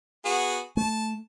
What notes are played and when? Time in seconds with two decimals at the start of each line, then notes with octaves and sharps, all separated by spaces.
0.25 B3 F#4 G#4
0.77 A3 A5